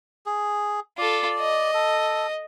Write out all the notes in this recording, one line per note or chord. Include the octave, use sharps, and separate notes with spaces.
G#4
F4 A4 D5
D#5
A4